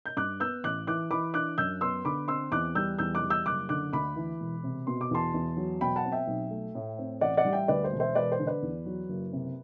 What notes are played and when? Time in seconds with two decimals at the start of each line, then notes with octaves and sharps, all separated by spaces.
0.06 G6
0.17 G2 D6 F#6
0.40 B3 E6 G6
0.64 A1 D6 F#6
0.87 E3 D6 F#6
1.11 E3 B5 D6
1.34 D4 D6 F#6
1.58 F#2 E6 G6
1.81 B3 C6 E6
2.05 D3 B5 D6
2.28 C4 C6 E6
2.51 E2 D6 F#6
2.75 G3 E6 G6
2.98 E2 E6 G6
3.15 D6 F#6
3.23 G3
3.30 E6 G6
3.46 F#1 D6 F#6
3.69 D3 D6 F#6
3.93 D2 B5 D6
4.16 E3
4.40 E1
4.64 C3
4.87 B2 C6
5.01 D6
5.11 E2 A5 C6
5.34 E2
5.57 F#3
5.81 B2 G5 B5
5.96 F#5 A5
6.05 C4
6.12 E5 G5
6.27 B1
6.51 A3
6.75 A2
6.99 C4
7.21 A1 D5 F#5
7.37 D5 F#5
7.45 G3
7.53 E5 G5
7.68 D2 B4 D5
7.84 C5
7.92 E1
8.00 C5 E5
8.15 E1 B4 D5
8.32 C5
8.39 D3
8.47 B4 D5
8.62 E2
8.86 F#3
9.09 F#1
9.33 C3